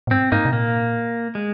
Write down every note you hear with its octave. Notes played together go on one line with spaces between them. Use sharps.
A#2
G#2 C4
G#2 A#3 D#4
C3
A#2 A#3
G#3